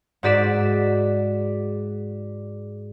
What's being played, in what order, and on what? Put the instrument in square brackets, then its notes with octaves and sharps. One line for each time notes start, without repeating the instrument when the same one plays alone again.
[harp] G#2 F#4 D5 B6 E7